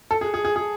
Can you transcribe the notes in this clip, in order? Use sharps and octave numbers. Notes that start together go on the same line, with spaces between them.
A4
G#4
G#4
G#4
G#4